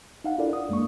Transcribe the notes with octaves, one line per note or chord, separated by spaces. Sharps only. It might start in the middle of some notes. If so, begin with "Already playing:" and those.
D#4 F5 F#5
D4 E4 F4 A4 A#4 D5
D#6
F#2 G#3 A#3 D4 C#6